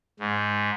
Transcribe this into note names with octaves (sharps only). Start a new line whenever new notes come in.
G#2